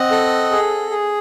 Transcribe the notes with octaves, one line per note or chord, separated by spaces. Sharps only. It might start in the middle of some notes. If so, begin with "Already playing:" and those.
Already playing: C4 D#5 F#5
A4
G#4
G#4